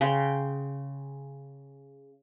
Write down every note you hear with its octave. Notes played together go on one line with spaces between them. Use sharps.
C#3 G5 C6